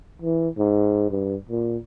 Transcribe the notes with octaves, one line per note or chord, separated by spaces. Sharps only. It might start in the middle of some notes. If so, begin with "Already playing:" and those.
E3
G#2
G2
A#2